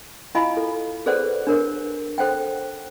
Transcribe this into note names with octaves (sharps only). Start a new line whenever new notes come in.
E4 F4 D#5 F5 G#5 B5
A4
G#4 A4 B4 C5 D5 F#5
D4 A#4 C#5
A4 C5 F#5 G5